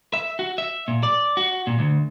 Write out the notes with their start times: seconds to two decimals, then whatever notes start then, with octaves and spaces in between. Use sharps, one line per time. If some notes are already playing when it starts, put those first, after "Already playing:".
0.14 E5
0.39 F#4
0.58 E5
0.88 A#2
1.03 D5
1.37 F#4
1.67 A#2
1.79 D2